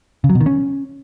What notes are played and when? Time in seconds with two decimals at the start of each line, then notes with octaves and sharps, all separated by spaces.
0.24 C#3
0.30 F#3
0.35 B2
0.41 D#3
0.46 C#4